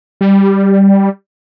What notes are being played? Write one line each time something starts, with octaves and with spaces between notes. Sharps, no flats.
G3